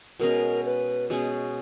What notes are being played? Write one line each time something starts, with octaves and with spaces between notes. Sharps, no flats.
B2 G#3 C#4 G#4 A#4
B4
B2 G#3 C#4 G#4